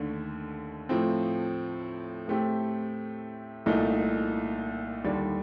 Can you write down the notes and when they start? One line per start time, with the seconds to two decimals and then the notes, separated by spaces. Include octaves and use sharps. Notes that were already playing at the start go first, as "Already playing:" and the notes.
Already playing: D#2 D3 A3
0.89 A2 F3 C4
2.28 A2 A3 C4 G4
3.66 C2 A#2 A3 D#4
5.04 D#2 D3 G3 D4